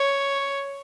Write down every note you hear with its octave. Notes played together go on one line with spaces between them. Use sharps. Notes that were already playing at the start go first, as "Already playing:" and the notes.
Already playing: C#5